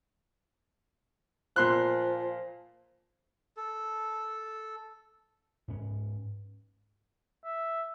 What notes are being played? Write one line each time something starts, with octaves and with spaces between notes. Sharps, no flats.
A#2 F3 C6 F#6
A4
G#2 C#4
E5